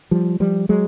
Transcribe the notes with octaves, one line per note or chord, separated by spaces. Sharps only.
F3 G3
F3 G3
F#3 G#3